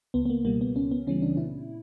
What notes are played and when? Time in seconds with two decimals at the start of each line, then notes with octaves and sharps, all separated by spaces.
0.14 C#2 B3
0.25 B3
0.30 A#3
0.45 B2 G3 A#3
0.61 B3
0.76 C#2 C#4
0.91 B3
1.07 C#3 E3 G3 C#4
1.22 D4
1.37 A#2 E4